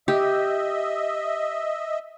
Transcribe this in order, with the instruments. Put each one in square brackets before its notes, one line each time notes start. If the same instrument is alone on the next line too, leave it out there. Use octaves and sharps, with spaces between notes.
[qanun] G4 [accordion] D#5 E5